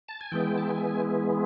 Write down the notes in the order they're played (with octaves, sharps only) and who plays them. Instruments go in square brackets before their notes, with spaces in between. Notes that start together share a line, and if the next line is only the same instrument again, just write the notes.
[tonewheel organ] A5
G#5
E3 G#3 B3 G5
A5
G#5